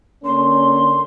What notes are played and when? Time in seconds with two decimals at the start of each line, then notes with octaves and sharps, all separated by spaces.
0.24 D3 A#3 C#4 C6